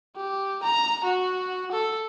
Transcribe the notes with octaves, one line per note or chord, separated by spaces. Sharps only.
G4
A#5
F#4
A4